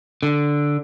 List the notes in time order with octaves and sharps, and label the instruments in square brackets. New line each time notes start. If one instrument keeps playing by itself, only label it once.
[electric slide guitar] D3